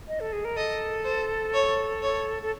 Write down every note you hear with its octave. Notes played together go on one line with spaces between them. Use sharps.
D#5
A4
G#4
A#4
A4 D#5
C5
C#5
C#5
A4